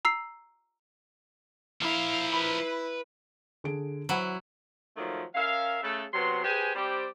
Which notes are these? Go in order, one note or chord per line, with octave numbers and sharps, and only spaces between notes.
A#5 E6 C7
F3 E4 A#4 F5
B4 B5
D3 G#4 D7
F#3 E4 C5 F#5 B5
D#3 F3 F#3 A3 A#3
C#4 A#4 E5 F5
C#3 A3 A4
C3 F#3 B3 C6
G4 G#4 B4 C5 G#5
G3 C4 G4 C5 D5